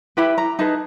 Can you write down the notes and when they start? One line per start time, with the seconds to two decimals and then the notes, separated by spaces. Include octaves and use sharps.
0.17 E4 G4 B4 B5
0.38 A#5
0.59 D#4 G#4 B4 A5